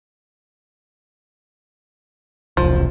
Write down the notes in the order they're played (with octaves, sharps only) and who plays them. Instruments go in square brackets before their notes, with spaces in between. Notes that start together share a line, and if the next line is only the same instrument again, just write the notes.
[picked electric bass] E1 C2 [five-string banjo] F3